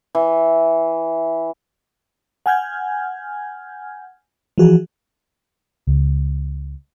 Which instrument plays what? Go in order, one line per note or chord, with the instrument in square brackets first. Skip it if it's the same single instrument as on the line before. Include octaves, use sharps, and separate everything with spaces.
[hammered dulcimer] E3
[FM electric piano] F#5 G#5 F6 G6 G#6
E3 F3 F#4 G#4
[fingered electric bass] C#2